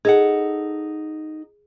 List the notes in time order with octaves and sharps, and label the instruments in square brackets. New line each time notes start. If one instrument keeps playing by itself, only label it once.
[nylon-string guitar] D#4 A4 F#5 [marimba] G#4